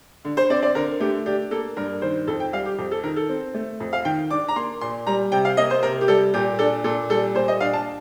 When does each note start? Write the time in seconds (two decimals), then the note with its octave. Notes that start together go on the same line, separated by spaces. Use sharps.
0.25 D3
0.37 C5
0.50 C4 D5
0.63 D5
0.75 D3 A#4
1.00 A3 G4
1.26 D4 G4
1.51 A#3 A4
1.77 G2 A#4
2.02 D#3 C5
2.27 F2 A4
2.40 G5
2.53 G3 F5
2.65 G4
2.78 F2 G4
2.91 A4
3.04 D#3 A#4
3.16 A4
3.29 C4
3.54 A3
3.80 F2
3.93 F5
4.05 D#3 G5
4.31 D4 D6
4.48 A#5
4.56 A#3 C6
4.81 A#2 C6
5.07 G3 A#5
5.32 C3 G5
5.45 F5
5.57 A#3 D#5
5.71 C5
5.83 C3 A#4
6.01 G4
6.08 G3 A4
6.34 A#2 G4
6.59 D4 A4
6.84 A#2 A4
7.10 G3 A4
7.35 A#2 C5
7.48 D#5
7.60 D4 F5
7.73 A5